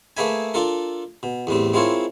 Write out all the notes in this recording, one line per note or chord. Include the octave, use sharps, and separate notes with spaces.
A3 A#3 G#4 B4 E5 G#5
D4 F4 A4 A#4
B2
E2 A2 G3 C4
G#3 C4 E4 F4 A#4 C#5